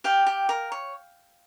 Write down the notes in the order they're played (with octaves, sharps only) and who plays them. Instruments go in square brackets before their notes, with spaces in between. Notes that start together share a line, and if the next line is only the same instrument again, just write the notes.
[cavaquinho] G4 F5 G5
G4
A#4
C#5